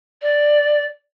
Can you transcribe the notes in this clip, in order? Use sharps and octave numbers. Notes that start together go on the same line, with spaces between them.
D5